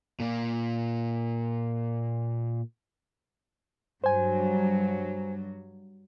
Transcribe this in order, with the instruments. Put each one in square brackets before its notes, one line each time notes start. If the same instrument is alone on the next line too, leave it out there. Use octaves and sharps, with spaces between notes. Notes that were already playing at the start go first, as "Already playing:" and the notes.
[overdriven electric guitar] A#2 A#3
[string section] G2 F#3 [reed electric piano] C5 G#5